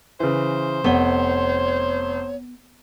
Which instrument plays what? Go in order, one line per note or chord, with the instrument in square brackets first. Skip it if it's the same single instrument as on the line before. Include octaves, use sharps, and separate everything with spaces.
[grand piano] C#3 E3 [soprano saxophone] C5
[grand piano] F1 F#5 G7 [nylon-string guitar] B3 [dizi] C#5